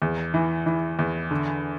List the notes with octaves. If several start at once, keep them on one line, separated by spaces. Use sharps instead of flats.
E2
E3
E3
E2
D3